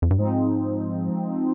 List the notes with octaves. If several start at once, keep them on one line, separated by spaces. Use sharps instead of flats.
F2
G2
G#2 F3 G#3 C4 D#4